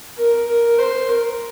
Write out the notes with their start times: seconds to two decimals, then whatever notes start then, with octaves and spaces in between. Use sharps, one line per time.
0.17 A#4
0.48 A#4
0.78 C5
1.09 A#4